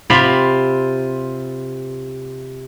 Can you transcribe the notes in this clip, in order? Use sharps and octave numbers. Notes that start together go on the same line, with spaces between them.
C3 F4 B5